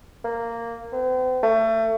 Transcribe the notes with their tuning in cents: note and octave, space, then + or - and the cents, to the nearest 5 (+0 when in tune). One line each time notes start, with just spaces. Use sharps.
A#3 -10
C4 -40
A3 +30